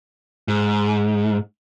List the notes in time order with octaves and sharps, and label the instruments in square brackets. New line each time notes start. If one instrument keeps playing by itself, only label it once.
[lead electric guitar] G#2